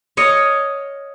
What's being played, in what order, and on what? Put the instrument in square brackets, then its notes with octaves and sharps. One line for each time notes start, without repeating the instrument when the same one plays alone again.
[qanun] C#5 D#5 F5